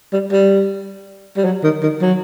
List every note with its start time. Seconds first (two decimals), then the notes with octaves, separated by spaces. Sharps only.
0.13 G3
0.32 G3
1.37 G3
1.45 F#3
1.63 D#3
1.83 D#3
2.01 F#3